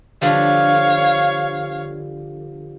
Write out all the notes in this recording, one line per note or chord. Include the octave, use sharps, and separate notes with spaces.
D3 F3 G3 C#5 F5